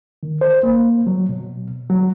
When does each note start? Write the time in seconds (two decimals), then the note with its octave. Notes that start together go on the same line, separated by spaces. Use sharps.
0.23 D#3
0.41 C5
0.63 A#3
1.07 F#3
1.29 B2
1.90 F#3